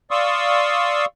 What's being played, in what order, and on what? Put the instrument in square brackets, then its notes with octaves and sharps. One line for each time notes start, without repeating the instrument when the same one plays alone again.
[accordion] D5 F5 C6 C#6 D#6 E6